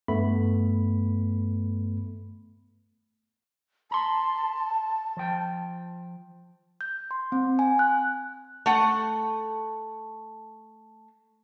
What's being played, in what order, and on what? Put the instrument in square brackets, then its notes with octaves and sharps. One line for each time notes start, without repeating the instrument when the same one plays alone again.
[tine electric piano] G2 A3 B3 B5
[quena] A5 [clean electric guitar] A#5 C6
[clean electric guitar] F3 G5
[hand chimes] G6
C6
C4
G#5
F#6
[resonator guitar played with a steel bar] A3 F#5